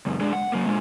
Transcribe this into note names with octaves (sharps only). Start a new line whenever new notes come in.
C#2 F#2
G#3 D4
F#5
F#3 A#3
A#2 G#3